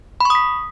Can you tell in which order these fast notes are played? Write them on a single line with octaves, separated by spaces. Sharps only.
B5 C#6 D#6 B6